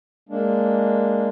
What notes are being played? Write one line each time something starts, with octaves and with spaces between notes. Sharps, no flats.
G#3 A#3 D4